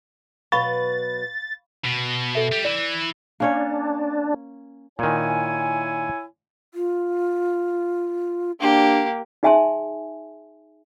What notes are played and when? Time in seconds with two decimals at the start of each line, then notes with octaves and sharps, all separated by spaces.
0.52 B2 F#3 B4 F5 B5 C#6 A6
1.85 B2
2.35 A4 E5
2.52 G3
2.65 E3 D5
3.40 A#3 C#4 D4 C#5
4.99 A#2 D#3 E4 C#5 G#5
6.74 F4
8.60 A#3 D4 G4
9.43 D#4 G#4 E5 G#5 A5 C6